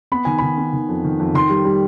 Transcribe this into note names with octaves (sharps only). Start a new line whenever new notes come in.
B3 B5
D#3 G#5
D#3 B5
B3
D#3
F2
D#3
F2
D#3 C6
G3
G3